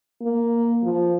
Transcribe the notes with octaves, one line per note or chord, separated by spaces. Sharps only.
A#3
F3